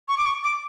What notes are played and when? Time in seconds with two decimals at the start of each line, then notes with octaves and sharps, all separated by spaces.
0.08 C#6
0.18 D6
0.26 C#6
0.44 D6